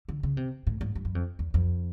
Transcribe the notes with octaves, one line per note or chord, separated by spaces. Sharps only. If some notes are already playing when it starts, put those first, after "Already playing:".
D3
C#3
C3
A2
G#2
G2
F#2
F2
E2
F2